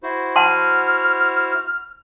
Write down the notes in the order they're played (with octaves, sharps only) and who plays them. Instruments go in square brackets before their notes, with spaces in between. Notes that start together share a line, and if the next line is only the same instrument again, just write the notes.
[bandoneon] E4 F#4 C5
[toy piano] F#5 A5 C6 [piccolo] F6